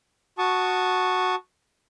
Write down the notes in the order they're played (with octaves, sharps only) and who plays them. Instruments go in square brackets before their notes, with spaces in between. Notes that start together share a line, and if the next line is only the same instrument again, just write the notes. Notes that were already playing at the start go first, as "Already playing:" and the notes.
[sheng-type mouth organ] F#4 A5 C#6 D#6